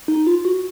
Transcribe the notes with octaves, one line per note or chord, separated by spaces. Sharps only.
D#4
F4
F#4